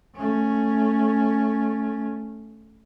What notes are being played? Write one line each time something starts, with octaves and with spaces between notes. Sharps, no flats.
A3 C#4